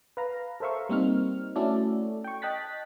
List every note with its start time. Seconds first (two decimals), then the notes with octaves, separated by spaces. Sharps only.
0.17 B4 F5 A#5
0.60 A4 A#4 C5 E5 F5 C#6
0.89 G3 A#3 C4 D#4 F6
1.56 A3 C#4 E4 F#4 A4 D5
2.24 G5 C#6
2.42 D#5 G5 A5 F#6 A6 B6